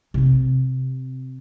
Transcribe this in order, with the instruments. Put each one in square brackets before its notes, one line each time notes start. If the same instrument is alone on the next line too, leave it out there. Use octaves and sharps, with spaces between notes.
[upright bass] C3 C4